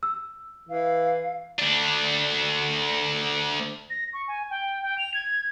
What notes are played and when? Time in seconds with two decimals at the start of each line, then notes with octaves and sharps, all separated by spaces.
0.03 E6
0.69 E3 F5
1.59 D2 D4
3.90 A#6
4.13 C#6
4.28 G#5
4.50 G5
4.82 G5
4.98 F7
5.14 G#6